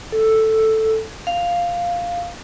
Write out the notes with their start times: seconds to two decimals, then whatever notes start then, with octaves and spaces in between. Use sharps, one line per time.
0.12 A4
1.27 F5